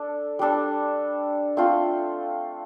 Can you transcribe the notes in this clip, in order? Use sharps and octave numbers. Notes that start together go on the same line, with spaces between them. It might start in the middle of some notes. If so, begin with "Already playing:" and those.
Already playing: D4 A4
G3 D4 A4
A3 C4 F4 A4